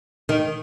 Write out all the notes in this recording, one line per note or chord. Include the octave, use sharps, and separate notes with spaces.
D#3